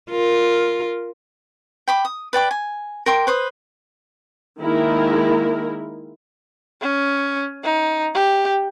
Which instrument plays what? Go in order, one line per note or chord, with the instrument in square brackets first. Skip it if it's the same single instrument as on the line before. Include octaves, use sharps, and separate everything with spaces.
[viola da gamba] F4 A#4
[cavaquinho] G5 B5 D6
D#6
B4 D5 G5 D6
G#5
A#4 G5 C6 D6
B4 C5 D#6
[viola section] D#3 G#3 A#3 E4 A#4
[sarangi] C#4
D#4
G4